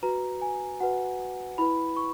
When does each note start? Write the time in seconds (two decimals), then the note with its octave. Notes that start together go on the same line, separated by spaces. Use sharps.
0.03 F#4 B4 A#5
0.42 G#5
0.80 F#4 B4 F#5
1.58 E4 B4 B5
1.97 C#6